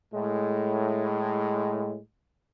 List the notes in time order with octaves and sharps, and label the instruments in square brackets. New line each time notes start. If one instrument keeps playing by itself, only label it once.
[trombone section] A2 G#3